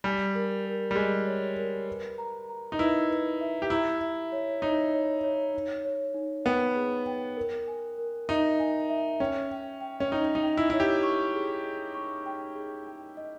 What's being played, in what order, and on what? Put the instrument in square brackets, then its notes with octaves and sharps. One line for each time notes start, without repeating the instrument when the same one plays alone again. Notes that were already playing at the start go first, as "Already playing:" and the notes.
[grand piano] G3 [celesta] G#5
[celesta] A#4
A#4
[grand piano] G3
[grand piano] G#3 [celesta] G#5
[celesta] C#5
A#4
B4
A#5
A#5
[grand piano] D#4
[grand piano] E4 [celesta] B4
[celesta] B4
E5
[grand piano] G4
[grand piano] E4 [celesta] A#5
[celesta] E5
C#5
[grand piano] D#4 [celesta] C#5
[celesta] C#5
C#5
D#4
C#5
D#4
[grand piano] B3 [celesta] G5
[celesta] G#4
G5
A#4
G#5
A#4
[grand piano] D#4 [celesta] E5
[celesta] G#5
E5
[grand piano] C#4 [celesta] G5
[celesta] G5
G5
[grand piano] C#4
[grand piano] D#4 [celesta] G5
[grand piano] D#4
[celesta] G5
[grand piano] E4
[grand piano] E4 [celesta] C#5
[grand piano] G4
[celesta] C#6
G#4
G#4
C#6
G5
G#4
G5
D#5